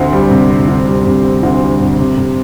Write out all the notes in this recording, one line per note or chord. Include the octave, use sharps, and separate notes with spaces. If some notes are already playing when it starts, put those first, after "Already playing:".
Already playing: D2 C4
G3
C3
C4
D2
G3
C3
C4
D2
G3
C3
C3
C3